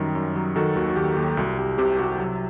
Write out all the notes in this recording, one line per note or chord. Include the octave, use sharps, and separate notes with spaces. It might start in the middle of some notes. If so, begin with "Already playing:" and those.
Already playing: F#2 D#3 G3
F#2
F#3
D#3 F#4 A4
D#2 F#4
F#4
D#2 G4
D#2 F#4
C2 F#4
C2 G4
C3 G4
C3 F#4
F#3